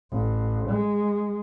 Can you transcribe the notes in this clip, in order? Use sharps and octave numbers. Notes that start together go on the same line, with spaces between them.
A1
G#3